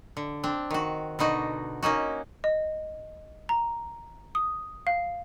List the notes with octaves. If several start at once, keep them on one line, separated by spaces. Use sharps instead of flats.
D3
C4 D4
D#3 F#4
B2 D3 D#4 F#4
A#3 C#4 D#4 F#4
D#5
A#5
D#6
F5